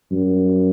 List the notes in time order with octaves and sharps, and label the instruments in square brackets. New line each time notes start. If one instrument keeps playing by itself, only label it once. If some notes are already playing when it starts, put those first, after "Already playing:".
[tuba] F#2